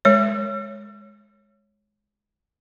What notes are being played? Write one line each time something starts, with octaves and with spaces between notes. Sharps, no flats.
G#3 C#5